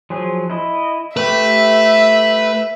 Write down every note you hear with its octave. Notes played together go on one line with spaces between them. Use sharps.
F3 F#3 G#4
E4 D#5
A3 G4 B4 E5